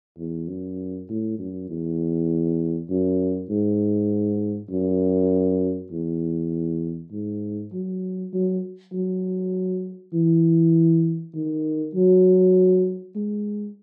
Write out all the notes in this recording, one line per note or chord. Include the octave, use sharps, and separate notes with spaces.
E2
F#2
A2
F#2
E2
F#2
G#2
F#2
E2
G#2
F#3
F#3
F#3
E3
D#3
F#3
G#3